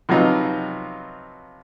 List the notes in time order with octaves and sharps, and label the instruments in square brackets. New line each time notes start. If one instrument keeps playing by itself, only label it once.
[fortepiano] C3 F3 F#3 B3 D#4 F4